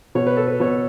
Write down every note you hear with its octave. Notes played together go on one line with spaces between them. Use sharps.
B2 C#5
B4
A4
B4
B2 C#5